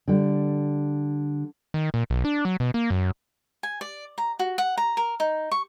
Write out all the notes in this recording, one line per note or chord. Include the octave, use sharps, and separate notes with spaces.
D3 G3
D#3
A#2
B1
D4
F#3
B2
A#3
F#2
G#5
D5
A#5
F#4
F#5
A#5
A#4
D#4
C#6